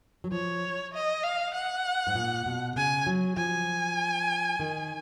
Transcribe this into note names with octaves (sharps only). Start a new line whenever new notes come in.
F#3
F3 C#5
D#5
F5
F#5
G#2
A#2
B2
C#3 G#5
F#3
F3 G#5
D#3